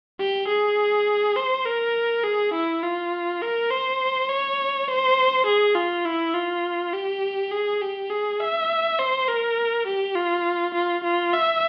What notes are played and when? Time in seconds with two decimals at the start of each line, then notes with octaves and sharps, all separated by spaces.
0.19 G4
0.48 G#4
1.36 C5
1.66 A#4
2.24 G#4
2.54 E4
2.83 F4
3.42 A#4
3.70 C5
4.29 C#5
4.88 C5
5.47 G#4
5.76 F4
6.06 E4
6.35 F4
6.93 G4
7.51 G#4
7.82 G4
8.10 G#4
8.40 E5
8.99 C5
9.28 A#4
9.87 G4
10.15 F4
10.74 F4
11.04 F4
11.34 E5